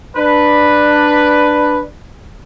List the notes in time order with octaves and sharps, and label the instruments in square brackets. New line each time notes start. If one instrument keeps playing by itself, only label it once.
[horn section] D4 B4